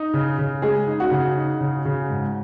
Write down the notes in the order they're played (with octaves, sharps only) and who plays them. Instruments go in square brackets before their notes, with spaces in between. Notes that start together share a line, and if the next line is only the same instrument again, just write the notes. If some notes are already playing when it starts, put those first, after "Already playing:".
Already playing: [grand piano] D#4
C#3
C#3
[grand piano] G#3 [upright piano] G#4
[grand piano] D#4
[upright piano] F#4
[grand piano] C#3
D#4
C#3
C#3
G#2